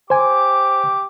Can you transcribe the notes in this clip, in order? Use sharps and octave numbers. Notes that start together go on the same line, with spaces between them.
G4 C5 G#5 D6